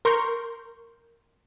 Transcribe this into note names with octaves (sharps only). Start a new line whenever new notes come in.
A#4 C6 C#6 G6